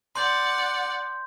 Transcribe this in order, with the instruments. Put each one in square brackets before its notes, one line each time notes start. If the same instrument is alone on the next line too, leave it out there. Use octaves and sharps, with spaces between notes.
[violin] D5 F#5 [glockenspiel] C6 G6